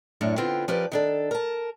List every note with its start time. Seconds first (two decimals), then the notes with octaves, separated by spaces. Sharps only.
0.21 F#2 A2 C#4 D4
0.37 D3 B3 C4 F4 G5
0.68 F3 C#4 G4 A#4 B4 D5
0.92 D#3 D4 A4
1.31 A#4 A5